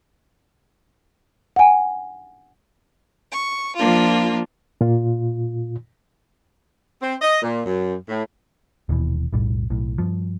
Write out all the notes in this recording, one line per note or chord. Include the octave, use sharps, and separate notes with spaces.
F#5 G#5
C#6
F3 A#3 D4 F4
A#2 F4
C4
D#5
A#2
F#2
A2
D#1 D#2 B2 E3
F1 B1 A2 G3
B1 A2
G2 F3